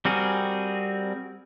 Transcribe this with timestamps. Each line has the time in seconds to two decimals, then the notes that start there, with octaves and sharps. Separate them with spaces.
0.05 G3 C4 F#4 G#4 A#4